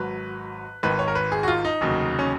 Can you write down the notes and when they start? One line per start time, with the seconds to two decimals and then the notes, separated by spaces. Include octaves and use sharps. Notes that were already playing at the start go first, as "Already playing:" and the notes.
Already playing: G#1 G#2 F#3 B4
0.83 G#1 G#2 D#3 B4
0.99 C#5
1.08 A#4
1.15 B4
1.32 G#4
1.43 F#4
1.48 F4
1.65 D#4
1.81 F1 D#2 C#3 F#3
2.19 C#4